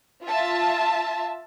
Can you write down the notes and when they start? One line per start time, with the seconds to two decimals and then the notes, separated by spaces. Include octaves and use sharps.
0.24 F4 E5 A5